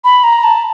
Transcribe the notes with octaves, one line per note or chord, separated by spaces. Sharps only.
B5
A#5
A5